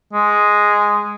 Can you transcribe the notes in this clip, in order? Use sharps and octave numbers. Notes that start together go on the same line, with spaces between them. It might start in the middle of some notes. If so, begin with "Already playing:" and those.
G#3